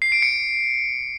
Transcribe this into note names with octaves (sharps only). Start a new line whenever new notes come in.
C7
D7
C#7